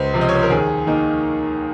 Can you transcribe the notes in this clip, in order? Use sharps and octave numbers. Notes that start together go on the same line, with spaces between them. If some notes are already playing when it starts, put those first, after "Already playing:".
Already playing: C#2 C5
C3 F3
D#5
C#5
C5
A#4
D#2 G#4
D#3 A#3 D#4